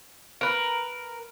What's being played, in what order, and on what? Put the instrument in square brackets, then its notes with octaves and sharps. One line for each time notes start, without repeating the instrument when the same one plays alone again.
[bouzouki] A#4 B4